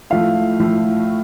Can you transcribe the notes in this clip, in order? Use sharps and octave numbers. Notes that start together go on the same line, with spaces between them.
A2 F3 A3 F5
A2 F3 A3